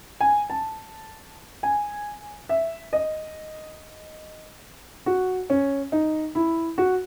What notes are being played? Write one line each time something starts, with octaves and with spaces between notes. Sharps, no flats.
G#5
A5
G#5
E5
D#5
F#4
C#4
D#4
E4
F#4